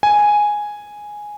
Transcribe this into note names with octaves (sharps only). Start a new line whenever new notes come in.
G#5